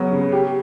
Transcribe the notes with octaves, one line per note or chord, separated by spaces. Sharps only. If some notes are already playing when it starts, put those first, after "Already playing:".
Already playing: C#3 F#3 B3
C#3
G4